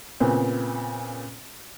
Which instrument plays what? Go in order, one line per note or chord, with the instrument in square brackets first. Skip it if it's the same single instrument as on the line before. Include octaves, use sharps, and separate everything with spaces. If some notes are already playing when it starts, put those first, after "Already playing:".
[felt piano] A#2 C#3 B3 C4